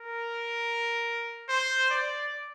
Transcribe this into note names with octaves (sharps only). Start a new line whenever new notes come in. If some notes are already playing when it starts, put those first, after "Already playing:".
Already playing: A#4
C5
D5